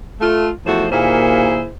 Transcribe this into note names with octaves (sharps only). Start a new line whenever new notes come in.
A3 F4
E2 F3 A3 F#4 C5
D#2 A#2 A#3 E4 G#4 C5